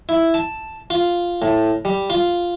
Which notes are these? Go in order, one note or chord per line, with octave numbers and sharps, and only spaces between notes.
E4
A5
F4
A2
G3
F4